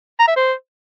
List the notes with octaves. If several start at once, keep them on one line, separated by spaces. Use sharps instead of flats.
A#5
E5
C5